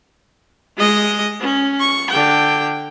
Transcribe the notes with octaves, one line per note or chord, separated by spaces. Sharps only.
G#3 D#5
C#4
C#6
D3 G5